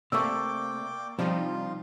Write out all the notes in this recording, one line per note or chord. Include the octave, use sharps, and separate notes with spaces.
C3 A3 A#3 D5 G5 C#6 D6 E6
C3 F3 G3 D4 D#4 F4